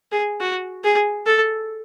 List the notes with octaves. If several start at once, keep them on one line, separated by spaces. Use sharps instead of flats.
G#4
F#4
G#4
A4